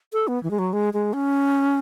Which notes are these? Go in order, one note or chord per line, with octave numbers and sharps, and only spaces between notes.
A4
B3
E3
G#3
F#3
G#3
G#3
C#4